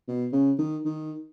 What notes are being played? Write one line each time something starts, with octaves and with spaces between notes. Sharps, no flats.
B2
C#3
D#3
D#3